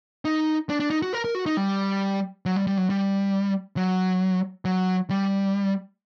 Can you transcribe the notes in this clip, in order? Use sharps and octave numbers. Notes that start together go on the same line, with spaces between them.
D#4
D4
D4
D#4
F#4
A#4
A#4
F#4
D#4
G3
F#3
G3
G3
F#3
G3
F#3
F#3
G3